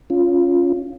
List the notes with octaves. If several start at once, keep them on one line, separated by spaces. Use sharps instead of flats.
C#4 F4